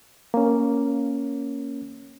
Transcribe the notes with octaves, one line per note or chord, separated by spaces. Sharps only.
A#3 C#4